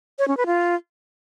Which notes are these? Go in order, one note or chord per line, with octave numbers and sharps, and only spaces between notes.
C#5
C#4
B4
F4